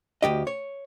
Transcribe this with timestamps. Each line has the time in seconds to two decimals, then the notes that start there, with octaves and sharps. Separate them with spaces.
0.22 D2 G#2 G4 D#5
0.47 C#5